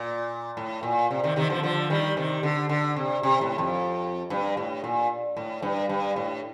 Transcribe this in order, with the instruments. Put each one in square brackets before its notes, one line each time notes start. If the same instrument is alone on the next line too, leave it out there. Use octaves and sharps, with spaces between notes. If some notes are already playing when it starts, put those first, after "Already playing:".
Already playing: [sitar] A#2
A2
A#2
C3
C3 D#3
C3 D#3
D3 F3
D3 F3
D#3 G3
C3 D#3
D3
D3
C3
C3
A2
F2
G2
A2
A#2
A2
G2
G2
A2